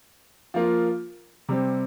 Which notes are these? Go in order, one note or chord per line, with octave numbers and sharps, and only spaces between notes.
F3 A#3 F4
C3 G3 C4